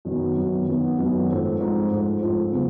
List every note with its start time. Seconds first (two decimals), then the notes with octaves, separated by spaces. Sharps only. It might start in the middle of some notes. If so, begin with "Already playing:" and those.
0.05 F#2 D#3 F#3 B3
0.36 F#2 D#3 F#3 B3
0.67 F#2 D#3 F#3 B3
0.98 F#2 D#3 F#3 B3
1.29 G#2 F3 A3 C4
1.60 G#2 F3 A3 C4
1.91 G#2 F3 A3 C4
2.22 G#2 F3 A3 C4
2.52 C#3 F#3 B3